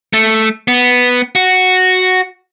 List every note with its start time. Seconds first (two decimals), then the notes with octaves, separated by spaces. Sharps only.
0.13 A3
0.68 B3
1.35 F#4